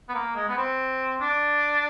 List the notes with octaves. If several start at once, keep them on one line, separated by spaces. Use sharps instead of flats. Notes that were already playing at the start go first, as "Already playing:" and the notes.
B3
A#3
G#3
B3
C4
D4